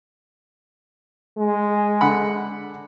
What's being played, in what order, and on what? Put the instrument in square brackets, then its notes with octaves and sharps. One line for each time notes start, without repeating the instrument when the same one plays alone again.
[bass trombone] G#3
[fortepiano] D3 F#5 B5